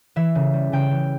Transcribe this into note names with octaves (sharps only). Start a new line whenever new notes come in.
E3 E5
C#3
G3
C#3 G5
E3